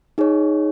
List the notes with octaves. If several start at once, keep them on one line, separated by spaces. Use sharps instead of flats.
D#4 G#4 C#5